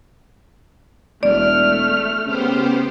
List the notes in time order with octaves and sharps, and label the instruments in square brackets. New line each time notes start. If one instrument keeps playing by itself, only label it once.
[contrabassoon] E1 [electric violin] A3 F6 [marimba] D5
[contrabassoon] C#3 [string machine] B3 G4 C5